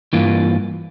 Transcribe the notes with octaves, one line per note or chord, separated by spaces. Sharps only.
G2 E3 A#3 F4